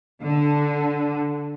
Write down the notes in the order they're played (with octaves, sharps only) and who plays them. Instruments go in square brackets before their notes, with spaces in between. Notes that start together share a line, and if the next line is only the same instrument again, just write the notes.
[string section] D3